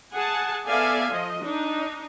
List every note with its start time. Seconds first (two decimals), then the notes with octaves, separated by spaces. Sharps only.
0.12 G#4 F#5 G#5 A5
0.67 B3 A4 D5 E5 F5 G#5
1.10 F3 D#5
1.42 D4 D#4